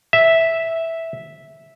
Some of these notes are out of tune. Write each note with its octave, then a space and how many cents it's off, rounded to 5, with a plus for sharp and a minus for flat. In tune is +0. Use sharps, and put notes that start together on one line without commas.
E5 -5